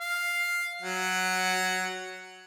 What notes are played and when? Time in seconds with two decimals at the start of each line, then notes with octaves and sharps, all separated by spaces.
0.01 F5
0.82 F#3 F#5